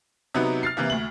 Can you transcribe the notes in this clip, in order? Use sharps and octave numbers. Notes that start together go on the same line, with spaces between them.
C3 F#3 B3 D#4
F6 A6 C7
C3 E3 A#3
D2 F#7